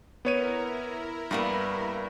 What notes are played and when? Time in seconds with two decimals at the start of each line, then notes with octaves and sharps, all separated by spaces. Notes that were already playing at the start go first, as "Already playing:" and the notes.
0.25 B3 E4 A#4 C#5 D#7
1.31 G2 G3 A#3 B3